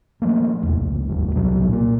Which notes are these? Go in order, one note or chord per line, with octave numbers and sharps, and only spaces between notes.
F3 A3 A#3
D#1 G#1 E2 C3
C#2
G1 D#2 G3
C2 C3 F#3
A#2 A#3